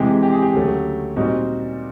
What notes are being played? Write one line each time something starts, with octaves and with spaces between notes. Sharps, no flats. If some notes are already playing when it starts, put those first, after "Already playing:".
Already playing: F2 C3 E3 G#3 G4
G4
G#4
G4
D2 C#3 F#3 A3
A#2 G3 C4 D#4 F#4